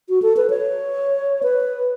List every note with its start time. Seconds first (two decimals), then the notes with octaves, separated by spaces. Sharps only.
0.09 F#4
0.22 A4
0.37 B4
0.50 C#5
1.43 B4